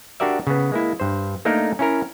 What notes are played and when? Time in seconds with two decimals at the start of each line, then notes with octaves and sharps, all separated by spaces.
0.20 D4 F#4 G4 A#4 D5 E5
0.47 C#3 B3
0.72 G#3 A#3 E4
1.00 G2 C5
1.45 A3 A#3 D4 D#4 A4 A#4
1.79 C#4 E4 A#4